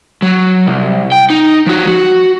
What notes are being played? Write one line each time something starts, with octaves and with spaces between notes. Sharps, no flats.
F#3
C2
G5
D#4
F3 F#4
F#4